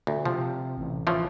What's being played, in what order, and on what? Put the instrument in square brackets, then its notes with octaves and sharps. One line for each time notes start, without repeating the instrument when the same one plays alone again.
[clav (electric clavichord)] D2
[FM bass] C3 [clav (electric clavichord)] F3
[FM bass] A1
[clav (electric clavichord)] E3 F3 C#4